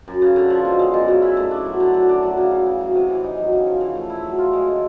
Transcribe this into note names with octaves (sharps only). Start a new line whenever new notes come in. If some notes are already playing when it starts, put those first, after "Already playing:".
F#2
C#3
D3
F3
B2
G#3
F#2
C#3
E4
A3
D4
F#3
D3
F#3
D4
F#3
C#3
E3
C#3
F#3
C3
E3
D#4
F#3
C#3
F3
E3
A3
E4
F#3
F4
G#3
D3